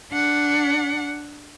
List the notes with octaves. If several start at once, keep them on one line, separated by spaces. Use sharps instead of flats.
D4 F#5